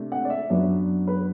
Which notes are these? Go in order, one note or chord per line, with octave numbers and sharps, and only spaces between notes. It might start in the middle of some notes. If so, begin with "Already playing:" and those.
Already playing: C3 A3 D4
F#5
D5
E5
F#2 F#3 B3 D4 D5
B4